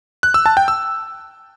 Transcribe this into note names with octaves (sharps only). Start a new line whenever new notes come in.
F#6
E6
A5
G5
E6